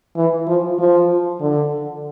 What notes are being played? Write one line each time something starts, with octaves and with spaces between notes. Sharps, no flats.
E3
F3
F3
D3